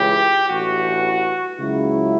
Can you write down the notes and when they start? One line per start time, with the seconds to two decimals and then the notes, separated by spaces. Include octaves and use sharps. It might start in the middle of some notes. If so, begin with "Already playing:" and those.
Already playing: C#2 C#3 E3 G4
0.48 A1 G2 E3 F#4
1.58 C#2 C#3 F#3 E4